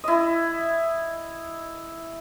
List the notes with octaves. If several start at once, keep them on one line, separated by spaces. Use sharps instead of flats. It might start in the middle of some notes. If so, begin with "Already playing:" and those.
E4 D#5